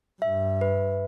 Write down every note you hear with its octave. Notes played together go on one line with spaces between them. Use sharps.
G2 E5
B4